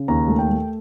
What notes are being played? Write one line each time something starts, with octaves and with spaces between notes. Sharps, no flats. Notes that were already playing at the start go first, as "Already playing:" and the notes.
Already playing: C#3
D#2 A#5
A3
G5
A3